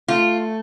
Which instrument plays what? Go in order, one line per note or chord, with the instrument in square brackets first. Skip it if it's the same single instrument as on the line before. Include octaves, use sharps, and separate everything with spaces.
[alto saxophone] A3 [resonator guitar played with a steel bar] F4